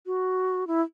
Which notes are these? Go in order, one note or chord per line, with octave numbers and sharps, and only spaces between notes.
F#4
E4